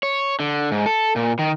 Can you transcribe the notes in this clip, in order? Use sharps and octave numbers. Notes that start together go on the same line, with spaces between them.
C#5
D3
G#2
A4
A#2
D#3